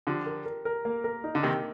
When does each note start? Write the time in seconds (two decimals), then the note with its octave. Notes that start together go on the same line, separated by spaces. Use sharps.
0.07 D3 F3 G4
0.26 A#4
0.46 A#4
0.65 A#4
0.85 A#3
1.04 A#4
1.24 D#4
1.35 D3
1.43 C3 D#3 A#3